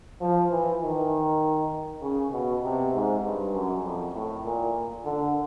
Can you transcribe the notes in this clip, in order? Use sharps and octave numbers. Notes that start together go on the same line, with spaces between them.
F3
E3
D#3
C#3
B2
C3
G#2
G2
F#2
F2
A2
A#2
D3